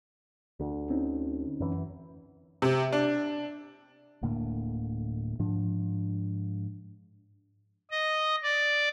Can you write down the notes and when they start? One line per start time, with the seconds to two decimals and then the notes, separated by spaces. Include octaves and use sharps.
0.60 D2 D4
0.90 C4 C#4 D#4
1.60 F#2 E3
2.62 C3
2.93 D4
4.23 D1 A2 D3 A#3
5.39 G#2 F3 D4
7.91 D#5
8.43 D5